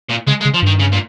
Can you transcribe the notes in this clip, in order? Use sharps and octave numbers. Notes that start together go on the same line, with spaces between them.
A#2
C#3 G#3
G#3
C#3
F3
G2 D#3
C#3
A#2